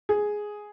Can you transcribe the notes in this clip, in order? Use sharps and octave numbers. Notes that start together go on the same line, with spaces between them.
G#4